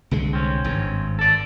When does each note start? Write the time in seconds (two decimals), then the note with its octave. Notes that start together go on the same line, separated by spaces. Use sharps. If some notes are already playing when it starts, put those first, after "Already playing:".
0.11 C2 D3 G#3
0.33 C4 C#4
0.64 G#1 G2
1.19 A4 D5